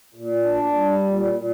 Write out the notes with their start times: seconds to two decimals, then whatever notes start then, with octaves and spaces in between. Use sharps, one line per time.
0.14 A#2
0.43 D4
0.74 G3
1.03 A#2
1.33 A#2